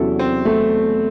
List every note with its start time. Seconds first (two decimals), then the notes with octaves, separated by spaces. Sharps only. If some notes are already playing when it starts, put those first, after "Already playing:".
Already playing: E2 C3 F#3 C#4 E4 A4
0.19 C4
0.45 A3